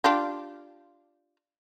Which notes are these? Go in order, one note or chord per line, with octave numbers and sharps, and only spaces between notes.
D4 F4 G4